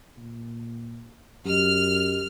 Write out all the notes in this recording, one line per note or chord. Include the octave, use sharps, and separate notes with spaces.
A#2
F#2 G4 D#5 F6